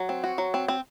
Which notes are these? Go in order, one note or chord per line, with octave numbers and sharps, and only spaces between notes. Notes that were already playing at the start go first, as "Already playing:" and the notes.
Already playing: F#3
C4
F#4
F#3
C4
C4